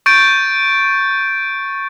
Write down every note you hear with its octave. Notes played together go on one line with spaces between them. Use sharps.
C#6 G6 A6 D7